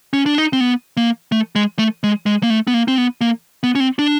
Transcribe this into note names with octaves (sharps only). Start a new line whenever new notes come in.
C#4
D4
D#4
C4
B3
A#3
A3
G#3
A3
G#3
G#3
A#3
A3
B3
A#3
C4
B3
A#3
B3
C#4
C4
D4